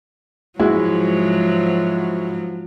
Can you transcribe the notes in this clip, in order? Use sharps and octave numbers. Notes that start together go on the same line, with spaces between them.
G#2 F3 F#3 G#3 E4 F#4